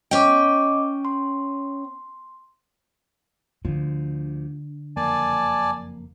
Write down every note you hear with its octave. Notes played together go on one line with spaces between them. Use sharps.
C#4 D#5 G5 D6
C6
D2 D3 F3
F#1 F2 A#3 D5 G#5 A5